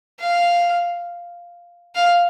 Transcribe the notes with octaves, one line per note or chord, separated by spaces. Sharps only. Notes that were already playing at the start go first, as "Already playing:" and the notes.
F5
F5